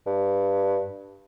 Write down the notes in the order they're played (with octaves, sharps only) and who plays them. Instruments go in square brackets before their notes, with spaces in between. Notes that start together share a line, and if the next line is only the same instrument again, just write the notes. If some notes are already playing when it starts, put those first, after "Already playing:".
[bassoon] G2